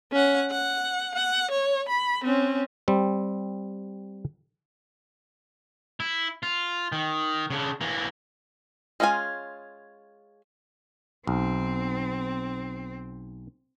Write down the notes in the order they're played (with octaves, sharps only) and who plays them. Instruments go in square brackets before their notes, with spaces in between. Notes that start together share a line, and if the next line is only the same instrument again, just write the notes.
[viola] C#4 F#5
F#5
F#5
C#5
B5
C4 C#4
[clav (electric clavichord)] G3 C4
[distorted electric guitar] E4
F4
D#3
C#3 D4
E3 A#3
[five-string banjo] G#3 C#4 F4 G#4 G#5
[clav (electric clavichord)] B1 [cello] C4